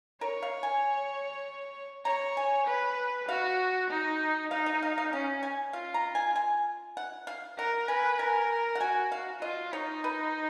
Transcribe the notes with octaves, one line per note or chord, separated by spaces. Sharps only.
A#4 C#5
F5
G#5
C#5 A#5
G#5
B4
F#4 F5
D#4
D#4 F5
D#5
F5
F5
C#4 F5
G#5
F4 F5
A#5
G#5
G#5
F#5
F5
A#4 F#5
B4 G#5
A#4 G#5
F#5
F#4 G#5
F5
F4 D#5
D#4 C#5
B4